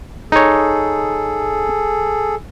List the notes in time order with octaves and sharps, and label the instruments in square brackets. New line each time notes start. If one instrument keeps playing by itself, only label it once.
[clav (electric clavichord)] D#4 C#5 [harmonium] G#4 A4